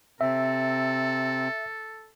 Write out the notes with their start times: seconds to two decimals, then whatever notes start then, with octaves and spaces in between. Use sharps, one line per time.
0.21 C3 C4 A4 E5